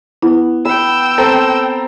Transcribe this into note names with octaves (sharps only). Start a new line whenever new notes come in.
B3 E4
G5 B5 E6
C4 A4 A#5